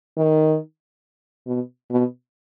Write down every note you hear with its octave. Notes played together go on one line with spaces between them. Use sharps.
D#3
B2
B2